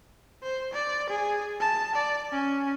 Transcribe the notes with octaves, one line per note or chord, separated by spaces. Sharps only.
C5
D5
G#4
A5
D5
C#4